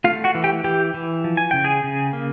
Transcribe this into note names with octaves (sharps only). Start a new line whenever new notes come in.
A3 F4 F5
F#4 F#5
E3
G4 G5
E3 G4 G5
E3
F3
G#5
C#3 G5
G#4 G#5
C#3
A#3